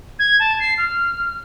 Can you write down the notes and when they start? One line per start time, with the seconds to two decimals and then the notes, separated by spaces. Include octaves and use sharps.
0.19 G#6
0.40 A5
0.60 C7
0.78 F6